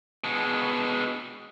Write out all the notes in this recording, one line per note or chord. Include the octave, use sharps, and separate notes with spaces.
B2 G#3